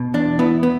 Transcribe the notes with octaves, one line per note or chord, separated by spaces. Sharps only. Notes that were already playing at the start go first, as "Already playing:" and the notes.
Already playing: B2
E2 D4
B3 E4
B3